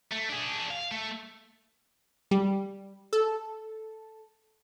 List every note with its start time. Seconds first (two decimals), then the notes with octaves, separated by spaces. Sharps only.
0.12 A3
0.29 D4 G#4
0.70 F5
0.91 A3
2.31 G3
3.13 A4